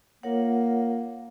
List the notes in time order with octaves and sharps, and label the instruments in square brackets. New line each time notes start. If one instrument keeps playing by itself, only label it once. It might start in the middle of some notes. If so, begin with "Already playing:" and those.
[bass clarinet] A#3 [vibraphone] F4 A#4 C#5 F#5